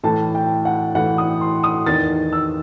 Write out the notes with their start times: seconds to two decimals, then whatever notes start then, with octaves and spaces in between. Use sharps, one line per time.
0.03 A2 E3 A5
0.35 G5
0.65 F#5
0.95 A2 E3 F#5
1.18 D#6
1.41 C6
1.64 D#6
1.86 E2 D#3 A6
2.33 E6